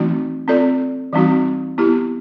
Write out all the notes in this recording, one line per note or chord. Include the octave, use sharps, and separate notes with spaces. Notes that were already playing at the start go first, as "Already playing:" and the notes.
Already playing: E3 A3 C4 D#4 F#4
C4 F4 A4 D5
E3 G3 C4 D#4 F#4
B3 E4 G4